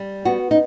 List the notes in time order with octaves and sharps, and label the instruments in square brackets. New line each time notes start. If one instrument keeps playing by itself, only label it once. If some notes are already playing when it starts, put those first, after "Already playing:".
Already playing: [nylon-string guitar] G3
B3 F#4
D#4